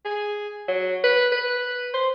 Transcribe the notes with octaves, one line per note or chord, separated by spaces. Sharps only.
G#4
F#3
B4
B4
C5